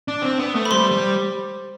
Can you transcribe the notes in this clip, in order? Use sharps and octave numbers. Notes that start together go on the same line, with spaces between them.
D4
C4
B3
A3
B5
G3 C5 C6
G3